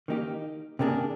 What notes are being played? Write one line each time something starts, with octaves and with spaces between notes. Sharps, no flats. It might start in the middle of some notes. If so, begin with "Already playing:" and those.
D#3 A#3 D#4 G4
C3 D#3 A#3 D4 G#4